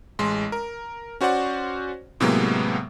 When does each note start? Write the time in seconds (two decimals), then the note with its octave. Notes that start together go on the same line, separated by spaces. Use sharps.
0.19 A1 G#3 C6
0.52 A#4
1.21 C#4 F#4 C5 D5 F#5
2.20 A2 C3 F#3 G#3 A#3 B3